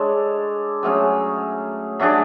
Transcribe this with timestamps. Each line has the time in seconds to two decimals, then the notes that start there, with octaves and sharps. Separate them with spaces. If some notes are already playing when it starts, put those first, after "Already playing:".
Already playing: G#3 D4 A4 C#5
0.83 F#3 A3 C#4 G#4
2.00 F#3 A3 D4 G#4